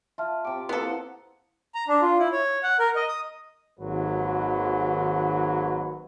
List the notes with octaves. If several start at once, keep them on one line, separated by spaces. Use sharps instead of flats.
F4 E5 A5 F6
C3 G5 D6
F3 A#3 B3 E4 G#4 A4 F#5
A#5
D4
F4
E4
C#5
F#5
A#4
D#5
D#6
G#1 D#2 G#2 F#3 B4